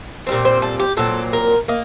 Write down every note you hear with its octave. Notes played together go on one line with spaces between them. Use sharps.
A#2 G3 C4
C5
A4
G4
A#2 F#3 C4 A4
A#4
A#3 D#5